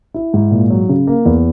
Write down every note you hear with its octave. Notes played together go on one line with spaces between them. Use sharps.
E4
G#2
A#2
F#3
C#3
A#3
E2